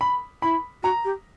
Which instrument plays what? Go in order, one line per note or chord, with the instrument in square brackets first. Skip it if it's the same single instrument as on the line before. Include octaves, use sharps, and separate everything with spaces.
[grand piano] B5
[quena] E4 [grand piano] B5
[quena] F#4 [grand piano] A#5
[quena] G4